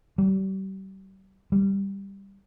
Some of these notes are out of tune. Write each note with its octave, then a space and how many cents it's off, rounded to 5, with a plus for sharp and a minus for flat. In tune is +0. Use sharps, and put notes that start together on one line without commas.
G3 -35
G3 +5